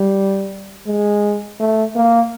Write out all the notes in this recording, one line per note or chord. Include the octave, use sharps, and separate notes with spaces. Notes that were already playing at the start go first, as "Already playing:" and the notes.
Already playing: G3
G#3
A3
A#3